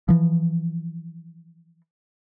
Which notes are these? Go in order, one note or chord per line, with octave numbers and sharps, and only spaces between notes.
E3 F3